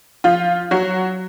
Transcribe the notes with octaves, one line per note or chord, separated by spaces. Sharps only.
F3 F4
F#3 F#4